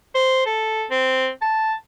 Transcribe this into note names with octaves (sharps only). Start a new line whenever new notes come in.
C5
A4
C4
A5